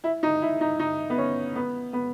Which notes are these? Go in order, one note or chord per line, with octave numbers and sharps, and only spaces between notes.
E4
D#4
E4
D#4
D#4
B3
C#4
B3
B3